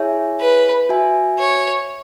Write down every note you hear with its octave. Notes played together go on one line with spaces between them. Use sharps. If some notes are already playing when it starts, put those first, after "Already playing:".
Already playing: E4 G#4 C#5 E5 G#5
B4
F#4 E5 G#5
C#5